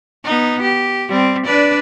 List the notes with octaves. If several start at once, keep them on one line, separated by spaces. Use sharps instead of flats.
B3 D#4
G4
G3 C4
D4 B4 D5